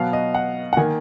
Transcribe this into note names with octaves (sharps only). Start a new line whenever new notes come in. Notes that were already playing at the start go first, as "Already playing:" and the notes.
Already playing: B2 F#3 B3 F5
D#5
F#5
F#5
D#3 A#3 G#5